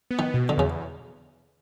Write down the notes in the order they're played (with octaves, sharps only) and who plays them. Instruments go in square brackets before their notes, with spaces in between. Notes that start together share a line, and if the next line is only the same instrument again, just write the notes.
[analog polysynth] B3
[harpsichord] D#3
[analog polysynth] B2
[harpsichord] D3
[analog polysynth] E2 [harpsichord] C#3